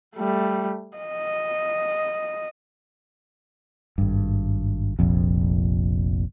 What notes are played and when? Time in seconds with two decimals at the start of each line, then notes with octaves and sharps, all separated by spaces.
0.15 G3 A3
0.97 D#5
3.98 G#1 G2
4.99 F1 A#1 F2